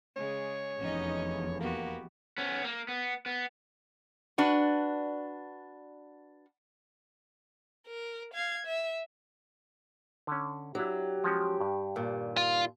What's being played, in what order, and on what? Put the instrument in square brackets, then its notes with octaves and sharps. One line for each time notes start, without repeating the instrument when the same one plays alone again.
[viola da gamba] C#3 G#3 G#4 [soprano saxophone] C#5
[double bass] F1 E2 [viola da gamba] C#4 D#4 D#5
[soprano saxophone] A#3 [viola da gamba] B3 F#4 G4
[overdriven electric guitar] B3 C#4
A#3
B3
B3
[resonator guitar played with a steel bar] D4 F#4 B4
[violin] A#4
F5 G#6
E5
[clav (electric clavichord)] D3 C#4
[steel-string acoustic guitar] F#3 [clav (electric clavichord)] D4 E4 [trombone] G4
[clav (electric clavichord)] F3 G#3 C#4
G2
[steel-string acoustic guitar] D#2 A#2
[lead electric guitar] F4